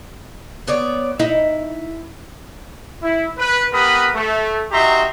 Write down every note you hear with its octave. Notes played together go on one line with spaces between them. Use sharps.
B3 C#5 D5
D#4 E4
E4
B4
B3 G4 A#4 B4 B5 D#6
A3
D#4 F#4 G4 E5 A#5 C6